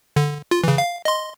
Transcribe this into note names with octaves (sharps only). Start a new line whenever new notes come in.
D3
F4
C#3 E3
F5
D#5 C6